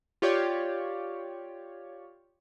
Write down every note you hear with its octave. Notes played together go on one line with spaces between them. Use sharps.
F4 G4 C#5 D5